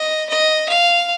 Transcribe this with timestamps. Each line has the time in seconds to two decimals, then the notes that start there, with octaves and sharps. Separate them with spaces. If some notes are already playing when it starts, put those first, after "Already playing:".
Already playing: D#5
0.29 D#5
0.69 F5